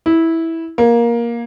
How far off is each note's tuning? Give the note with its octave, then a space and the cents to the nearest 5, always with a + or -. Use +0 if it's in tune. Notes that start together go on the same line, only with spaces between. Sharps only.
E4 -10
A#3 +15